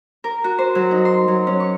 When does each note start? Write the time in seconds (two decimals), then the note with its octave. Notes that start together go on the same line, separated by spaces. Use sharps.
0.24 A#4
0.44 F#4
0.58 C5
0.75 F#3
0.91 D#4
1.05 C6
1.28 F#3
1.47 C#4
1.60 C#6